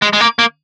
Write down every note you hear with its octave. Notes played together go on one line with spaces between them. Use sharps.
G#3
G#3
A#3
A#3